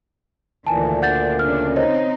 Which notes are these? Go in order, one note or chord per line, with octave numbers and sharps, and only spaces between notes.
D2 A#2 D#3 E3 G#5 A5
D4 F#5 G6 A6
C#3 C#4 D4 F6
C4 D#4 C5 C#5 D#5